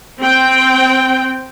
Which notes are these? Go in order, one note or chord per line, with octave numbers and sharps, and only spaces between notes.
C4 G5